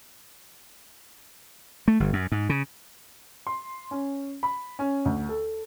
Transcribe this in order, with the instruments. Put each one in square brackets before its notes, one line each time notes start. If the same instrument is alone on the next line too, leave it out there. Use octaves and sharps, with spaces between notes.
[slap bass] A3
G1
F#2
G#2
C#3
[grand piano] C6
C#4
B5
C#4
D2
A4